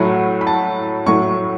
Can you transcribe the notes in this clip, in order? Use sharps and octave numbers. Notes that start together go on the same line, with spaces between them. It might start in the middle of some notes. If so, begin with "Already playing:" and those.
Already playing: A2 F#3 A3 F#5
B5
A5
A2 F#3 A3 C#6